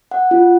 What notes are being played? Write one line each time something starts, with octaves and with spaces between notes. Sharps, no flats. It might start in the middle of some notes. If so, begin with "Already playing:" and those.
F#5
F4